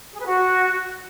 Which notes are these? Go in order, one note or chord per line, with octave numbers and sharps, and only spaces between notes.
G#4
B4
F#4